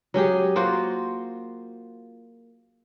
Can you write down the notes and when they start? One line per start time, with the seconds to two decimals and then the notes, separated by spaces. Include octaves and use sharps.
0.14 F#3 C#4 G4 G#4
0.56 A#3 F4 F#4 C5